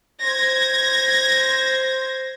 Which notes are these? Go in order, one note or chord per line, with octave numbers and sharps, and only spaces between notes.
C5 G#6 A#6